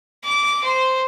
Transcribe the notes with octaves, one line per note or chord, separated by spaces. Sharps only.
D6
C5